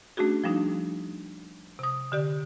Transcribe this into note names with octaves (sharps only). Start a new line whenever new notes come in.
A3 C#4 D4 F#4 G#4
F3 G3 D4 D#4
C3 D#6
D3 G4 D5